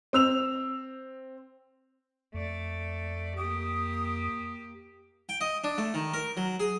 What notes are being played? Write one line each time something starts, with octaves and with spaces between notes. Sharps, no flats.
C4 E6 F7
F2 A3 D5
A#3 G4 D#6
G5
D#5
D4
A3
D#3
A#4
F#3
G#4